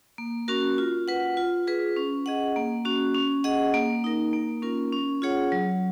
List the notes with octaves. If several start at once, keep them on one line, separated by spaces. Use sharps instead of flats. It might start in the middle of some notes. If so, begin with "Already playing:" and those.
A#3
C#4 F#4 A#4
F4
B4 F#5
F4
G#4 B4
C#4
G#4 D#5 F#5
A#3
C#4 F#4
C#4
G#4 D#5 F#5
A#3
D#4 A#4
A#3
C#4 F4 A#4
C#4
F4 G#4 C#5 F#5
F#3